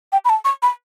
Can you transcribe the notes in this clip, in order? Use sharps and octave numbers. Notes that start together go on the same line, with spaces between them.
G5
B5
A5
C#6
B5